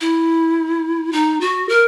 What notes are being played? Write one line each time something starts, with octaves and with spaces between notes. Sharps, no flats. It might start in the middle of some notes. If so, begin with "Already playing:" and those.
E4
D#4
F#4
A#4